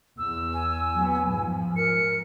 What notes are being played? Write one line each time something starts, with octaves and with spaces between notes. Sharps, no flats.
E2 E6
G#5
F#3 B3
G#2 F3
A#4 C#7